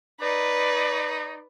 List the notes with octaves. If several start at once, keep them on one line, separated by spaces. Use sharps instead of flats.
D#4 B4 D5